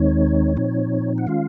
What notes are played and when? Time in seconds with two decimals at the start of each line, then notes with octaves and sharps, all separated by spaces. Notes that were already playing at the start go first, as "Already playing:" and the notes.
Already playing: D#2 D#3 G#3 C4 D#4 C#5
0.57 A#2 F3 C4 D#4
1.18 F#5
1.27 D#3 G#3 C#4 F4 F5